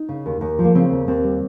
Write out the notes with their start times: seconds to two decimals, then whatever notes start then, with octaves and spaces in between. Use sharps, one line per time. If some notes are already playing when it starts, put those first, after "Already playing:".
Already playing: D#4
0.09 C#3
0.26 D#2
0.41 D#2
0.59 F3
0.64 A#3
0.75 C#3 C4
0.90 D#2
1.08 D#2 C4
1.23 G3